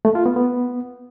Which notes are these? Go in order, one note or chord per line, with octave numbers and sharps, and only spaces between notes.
A3
F4
B3
B3